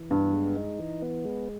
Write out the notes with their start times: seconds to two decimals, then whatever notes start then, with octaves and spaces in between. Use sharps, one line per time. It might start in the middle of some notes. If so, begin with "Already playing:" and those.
Already playing: E3
0.10 G2 B3
0.33 G#3
0.56 D#4
0.79 E3
1.02 B3
1.25 G#3